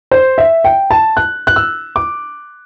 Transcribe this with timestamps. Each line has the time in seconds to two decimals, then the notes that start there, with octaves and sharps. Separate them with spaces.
0.12 C5
0.38 E5
0.64 G5
0.91 A5
1.17 F#6
1.47 F#6
1.56 E6
1.96 D6